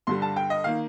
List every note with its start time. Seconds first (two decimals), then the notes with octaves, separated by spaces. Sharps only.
0.07 G2 D3 G3 C6
0.22 A5
0.36 G5
0.50 D#5
0.64 D#3 A#3 F5